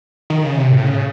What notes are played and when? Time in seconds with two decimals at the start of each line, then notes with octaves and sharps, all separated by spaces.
0.30 D#3
0.44 C#3
0.58 C3
0.71 A2
0.86 C#3